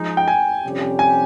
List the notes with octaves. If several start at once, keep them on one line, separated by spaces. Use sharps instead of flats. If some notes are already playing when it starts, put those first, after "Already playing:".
Already playing: F3 G#3 D#4
G5
G#5
F2 C3 G3 C#4 G4
G#5